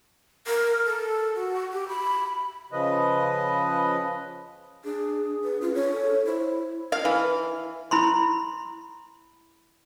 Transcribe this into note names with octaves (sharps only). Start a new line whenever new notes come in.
A#4
A4
F#4
G4
B5
C#3 F3 B4 D#5
D4 G#4
B4
C#4 F4
D4 C#5
A4
E4 C5
F5
E3
E4 B5 C6